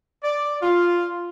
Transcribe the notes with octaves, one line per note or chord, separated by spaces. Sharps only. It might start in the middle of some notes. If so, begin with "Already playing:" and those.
D5
F4